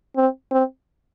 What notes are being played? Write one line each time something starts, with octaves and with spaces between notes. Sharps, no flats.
C4
C4